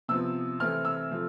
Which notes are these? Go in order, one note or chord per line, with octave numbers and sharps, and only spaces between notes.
C3 F3 B3 E6
C3 E3 A3 C4 F6
E6
C3 F3 A3